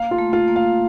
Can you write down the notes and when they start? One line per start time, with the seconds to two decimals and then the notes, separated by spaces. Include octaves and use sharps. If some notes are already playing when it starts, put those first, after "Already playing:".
Already playing: A#3 F5
0.11 F4
0.18 A3
0.33 F4
0.48 A#3
0.56 F5